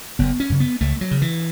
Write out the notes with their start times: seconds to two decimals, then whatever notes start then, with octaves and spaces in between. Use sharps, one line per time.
0.19 F#1 B3
0.40 C#4
0.50 F#2 C#3
0.60 B3
0.81 C#2 A3
1.01 F#3
1.11 C#3
1.22 E3